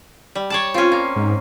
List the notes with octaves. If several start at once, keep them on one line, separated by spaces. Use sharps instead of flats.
G3
C#5 D5 A5
C4 C#4 F4
A#3
G#2